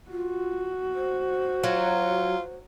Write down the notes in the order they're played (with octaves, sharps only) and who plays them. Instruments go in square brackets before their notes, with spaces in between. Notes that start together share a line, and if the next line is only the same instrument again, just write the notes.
[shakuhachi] F4 [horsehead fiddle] F#4
[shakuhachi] C5
[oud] F#3 [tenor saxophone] F4